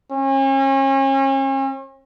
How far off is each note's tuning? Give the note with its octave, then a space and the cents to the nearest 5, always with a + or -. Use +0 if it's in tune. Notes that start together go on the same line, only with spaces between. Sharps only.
C#4 -40